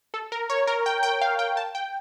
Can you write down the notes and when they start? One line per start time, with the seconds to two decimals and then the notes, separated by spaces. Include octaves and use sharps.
0.14 A4
0.32 A#4
0.50 C#5
0.67 A#4
0.86 G5
1.03 G5
1.21 F5
1.39 G5
1.57 A5
1.75 G5